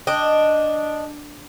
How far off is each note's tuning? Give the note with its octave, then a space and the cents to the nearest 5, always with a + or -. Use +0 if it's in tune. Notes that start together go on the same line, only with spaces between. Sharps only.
D4 +0 D#5 -10 G5 +0